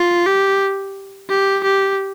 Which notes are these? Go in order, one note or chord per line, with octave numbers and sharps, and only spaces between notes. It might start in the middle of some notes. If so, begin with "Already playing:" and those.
Already playing: F4
G4
G4
G4